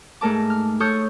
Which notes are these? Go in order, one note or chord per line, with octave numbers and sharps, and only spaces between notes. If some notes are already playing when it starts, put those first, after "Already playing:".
G#2 A3 A#4 A5 D6
F6
A4 C#5 C#6 D#6 F6 G6